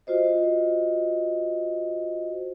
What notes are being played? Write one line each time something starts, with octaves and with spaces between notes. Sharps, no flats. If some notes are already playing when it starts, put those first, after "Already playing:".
F4 F#4 C5 D#5